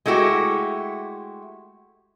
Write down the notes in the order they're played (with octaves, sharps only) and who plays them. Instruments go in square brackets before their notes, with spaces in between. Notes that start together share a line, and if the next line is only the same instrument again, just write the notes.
[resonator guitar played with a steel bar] G#3 A3 E4 F#4 G4